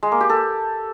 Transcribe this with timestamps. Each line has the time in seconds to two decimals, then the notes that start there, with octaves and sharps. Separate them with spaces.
0.03 G#3
0.12 A#3
0.21 G4
0.29 A4